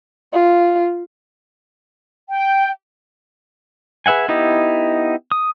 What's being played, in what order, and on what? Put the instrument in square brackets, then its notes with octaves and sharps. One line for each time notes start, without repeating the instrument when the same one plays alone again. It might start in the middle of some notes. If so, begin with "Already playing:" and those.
[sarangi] F4
[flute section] G5
[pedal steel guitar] G#4 B4 E5 F#5 G#5
B3 D#4 E4 G4 D#5
D#6